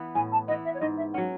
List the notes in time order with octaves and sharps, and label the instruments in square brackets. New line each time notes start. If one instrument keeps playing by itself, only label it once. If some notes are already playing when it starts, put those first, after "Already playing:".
Already playing: [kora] E3 B3
[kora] A2 [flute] G#5
[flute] A5
[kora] E3 B3 [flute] D#5
[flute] E5
C#5
[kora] G#2 [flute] D#5
[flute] E5
[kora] F#3 C#4 [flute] F#5